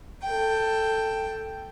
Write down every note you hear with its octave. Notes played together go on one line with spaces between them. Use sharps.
A4 G5